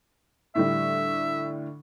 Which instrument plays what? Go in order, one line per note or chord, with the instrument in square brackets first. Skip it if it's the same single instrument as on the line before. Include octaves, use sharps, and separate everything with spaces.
[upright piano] A2 D3 G3 [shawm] E5